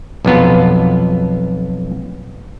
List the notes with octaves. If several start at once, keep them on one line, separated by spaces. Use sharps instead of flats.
B1 F2 B3 F4